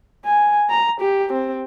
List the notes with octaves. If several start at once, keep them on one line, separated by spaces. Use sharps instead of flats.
G#5
A#5
G4
C4